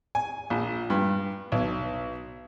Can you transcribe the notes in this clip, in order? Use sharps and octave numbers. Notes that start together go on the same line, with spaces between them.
G#5
A#1
G2
B1